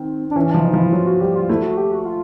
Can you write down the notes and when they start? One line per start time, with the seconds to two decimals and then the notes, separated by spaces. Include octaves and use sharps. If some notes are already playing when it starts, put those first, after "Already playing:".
Already playing: D#3 C4
0.31 D4
0.36 E3 C#4
0.51 F3 D4
0.60 E4
0.65 D#4
0.73 F3
0.78 E4
0.92 F#3 F4
1.07 F#4
1.21 G3 G4
1.35 F4
1.49 A3 E4
1.63 F#4
1.77 G4
1.91 F#4
2.05 F4